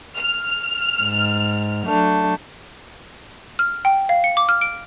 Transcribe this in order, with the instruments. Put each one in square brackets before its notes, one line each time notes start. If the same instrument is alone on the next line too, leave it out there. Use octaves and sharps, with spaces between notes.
[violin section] F6
[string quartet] G#2
F#3 A3 D4
[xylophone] F6
G5
F5
C#7
D6
F6
D7